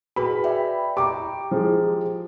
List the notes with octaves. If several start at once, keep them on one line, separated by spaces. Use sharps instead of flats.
F#4 G#4 B4 B5
D5 E5 G5
G4 G5 A#5 D6
F3 G#3